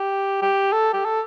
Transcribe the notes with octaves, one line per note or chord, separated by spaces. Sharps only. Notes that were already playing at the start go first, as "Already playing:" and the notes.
Already playing: G4
G4
A4
G4
A4